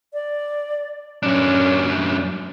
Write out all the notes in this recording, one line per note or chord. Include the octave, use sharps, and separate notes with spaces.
D5
F#2 C#4 D4